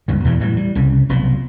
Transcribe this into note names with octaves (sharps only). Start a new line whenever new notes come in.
C#2 G2 D#3
E2 B2 E3 F3
A2 E3 F#3 G3
G3
C2 C#3
F1 B1 B2 F3